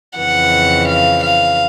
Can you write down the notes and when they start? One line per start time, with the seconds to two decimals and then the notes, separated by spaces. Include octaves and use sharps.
0.18 F2 C#3 E3 F#5
0.88 F5
1.23 F5